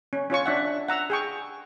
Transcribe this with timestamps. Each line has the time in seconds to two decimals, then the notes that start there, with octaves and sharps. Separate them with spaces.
0.13 C#4
0.30 C#4 F4 C#5 C#6
0.46 D4 E5 F#5
0.89 F#5 A#5 E6
1.10 G#4 G5 C#6